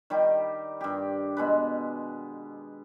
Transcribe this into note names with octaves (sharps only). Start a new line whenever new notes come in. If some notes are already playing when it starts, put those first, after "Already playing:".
D#3 G3 G4
G2 G4
B2 G#3 B4